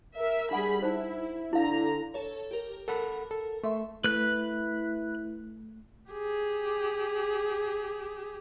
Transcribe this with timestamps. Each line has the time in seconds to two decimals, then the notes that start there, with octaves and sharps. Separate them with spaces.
0.15 A#4 E5
0.51 G3 D4 G#4 F#5 G#5 B5
0.82 D#4 E4 C5
1.53 D3 E4 F5 A#5
2.14 A4 C#5
2.51 G4 A#4
2.88 A4 A#4 F#5 B5
3.31 A4
3.63 A3 E5 C6 C#6
4.04 A3 E4 B4 F#6
6.11 G4 G#4